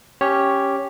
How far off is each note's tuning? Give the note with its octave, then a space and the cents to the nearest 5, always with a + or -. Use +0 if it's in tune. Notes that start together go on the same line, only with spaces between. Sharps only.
C#4 +0 G4 +0 C#5 +0